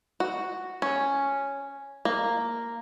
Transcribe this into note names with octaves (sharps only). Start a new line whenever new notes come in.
F#4
C#4
A#3